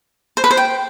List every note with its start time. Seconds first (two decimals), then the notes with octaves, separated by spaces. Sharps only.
0.37 C5
0.44 B4
0.51 C5
0.57 G5